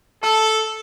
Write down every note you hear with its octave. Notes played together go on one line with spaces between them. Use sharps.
A4 A5 E6